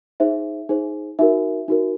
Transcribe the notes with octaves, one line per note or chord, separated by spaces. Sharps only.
D#4 G#4 C5 E5
D#4 G#4 C5
D#4 F#4 A#4 E5
D#4 F#4 A#4